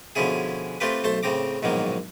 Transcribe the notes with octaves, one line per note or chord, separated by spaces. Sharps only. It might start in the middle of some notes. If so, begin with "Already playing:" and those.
B2 D3 F3 C#4 E4 G#4
A3 C4 F4 G4 B4
B1 A3 A4 C5 A5
A2 C#3 C4 A#5 D6
A#1 G#2 B2 D#3 F#3 A#3